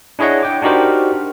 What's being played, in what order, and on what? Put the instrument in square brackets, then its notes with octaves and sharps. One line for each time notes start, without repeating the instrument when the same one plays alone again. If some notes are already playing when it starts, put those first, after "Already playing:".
[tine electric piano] D4 E4 G#4 C#5 D#5 F#5
G5 D6
D4 D#4 F#4 G4 A#4 C5